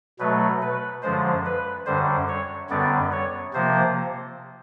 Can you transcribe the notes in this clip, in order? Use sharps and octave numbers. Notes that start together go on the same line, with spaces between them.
B2 F#3 A3 B4
B4
F#2 D3 F3 G#3 C5
B4
F#2 D3 G3 C5
C#5
F#2 D3 G3 B3 D5
C#5
C3 F3 A#3 C5